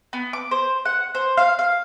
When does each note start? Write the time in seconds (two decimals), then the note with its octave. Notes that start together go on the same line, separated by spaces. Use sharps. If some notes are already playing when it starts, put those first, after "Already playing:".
0.13 B3
0.33 D6
0.51 C5
0.85 F#5
1.15 C5
1.37 F5
1.59 F5